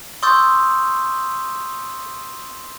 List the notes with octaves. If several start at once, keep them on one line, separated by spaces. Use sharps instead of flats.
C6 C#6 D#6 E6 G6 A6